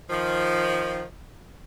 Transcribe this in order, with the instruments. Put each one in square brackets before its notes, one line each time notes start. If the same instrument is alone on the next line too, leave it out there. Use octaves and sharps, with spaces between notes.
[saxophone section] D#3 F3